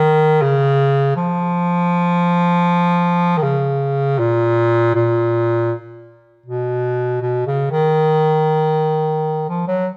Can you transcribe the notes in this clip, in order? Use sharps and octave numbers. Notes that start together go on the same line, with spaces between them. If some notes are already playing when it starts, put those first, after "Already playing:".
Already playing: D#3
C#3
F3
D#3
C#3
A#2
A#2
B2
B2
C#3
D#3
F3
F#3